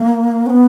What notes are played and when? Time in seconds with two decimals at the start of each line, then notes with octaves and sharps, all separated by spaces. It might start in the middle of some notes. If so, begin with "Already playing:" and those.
Already playing: A#3
0.46 C#4
0.50 B3